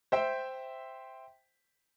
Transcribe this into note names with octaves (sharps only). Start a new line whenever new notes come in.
C5 E5 G5